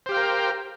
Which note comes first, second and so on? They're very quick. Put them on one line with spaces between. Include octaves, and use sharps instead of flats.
C5 G4 F5 G5 A#4